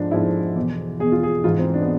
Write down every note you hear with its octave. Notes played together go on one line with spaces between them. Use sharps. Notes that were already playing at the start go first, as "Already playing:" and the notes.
Already playing: G#2 F3 D4
G#2 F3 E4
E2 B2
E2 B2 G#4
F4
G#4
G#2 E3 F4
C4
D4
B3